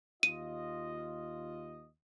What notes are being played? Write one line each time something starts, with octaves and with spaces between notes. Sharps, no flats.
D#2 F4 D#5 D#7